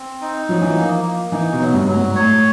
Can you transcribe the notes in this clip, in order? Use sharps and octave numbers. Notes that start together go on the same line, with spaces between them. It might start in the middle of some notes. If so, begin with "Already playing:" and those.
Already playing: C4
D#4
F3 F#3
E3
F3 A#3
A#3
E3 D#4
B2
F#3
G2
F#3
G#2
A2 C#5